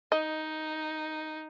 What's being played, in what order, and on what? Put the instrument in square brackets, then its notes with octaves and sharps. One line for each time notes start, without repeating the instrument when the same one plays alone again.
[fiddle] D#4 [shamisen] D#5